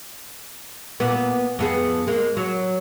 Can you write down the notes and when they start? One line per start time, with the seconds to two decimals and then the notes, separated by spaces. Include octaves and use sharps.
1.00 A#2 B3
1.59 F2 B3 G#4
2.07 G#3 A#3
2.37 F#3